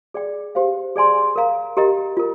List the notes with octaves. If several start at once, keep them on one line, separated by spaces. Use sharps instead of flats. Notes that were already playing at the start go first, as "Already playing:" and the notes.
G#4 D5 G5
G4 C5 F5
G#4 D5 G#5 C6
A#4 F5 A#5
G4 A#4 D#5 A#5
F4 A#4